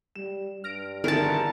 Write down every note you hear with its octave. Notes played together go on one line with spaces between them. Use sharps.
G3 E7
G2 F6 A#6 D7
D3 D#3 B3 D4 E4 G#4 A#4 A5